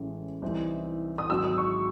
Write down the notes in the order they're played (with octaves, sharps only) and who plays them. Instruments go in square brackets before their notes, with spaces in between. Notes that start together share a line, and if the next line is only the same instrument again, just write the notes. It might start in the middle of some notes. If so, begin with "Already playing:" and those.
Already playing: [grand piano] A1 A2 E3 G#3 C#4
C2 C3 E3 C4 D#4
[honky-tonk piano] D#6
[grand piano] G#1 G#2 F#3 [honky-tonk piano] E6
[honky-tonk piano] D#6
C#6